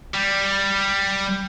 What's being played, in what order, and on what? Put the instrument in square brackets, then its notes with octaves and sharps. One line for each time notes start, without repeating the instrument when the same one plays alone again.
[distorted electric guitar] G3